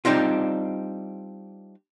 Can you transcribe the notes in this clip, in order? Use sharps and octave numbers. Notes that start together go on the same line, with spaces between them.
G3 C4 D4 D#4 F4